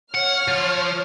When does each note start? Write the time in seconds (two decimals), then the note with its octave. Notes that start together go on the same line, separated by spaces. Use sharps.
0.15 C#5 F#5 F6
0.48 F3